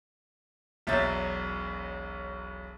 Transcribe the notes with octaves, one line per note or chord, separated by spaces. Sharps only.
E1 B1 F#3 E5 G6 A6